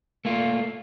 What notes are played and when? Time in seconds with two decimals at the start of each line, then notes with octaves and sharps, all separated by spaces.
0.25 A3 A#3 F4